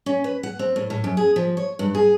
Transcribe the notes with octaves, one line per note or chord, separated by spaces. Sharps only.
C#4
B4
F#5
C4
A2
A2
F#2
G#4
F3
C#5
G2
G#4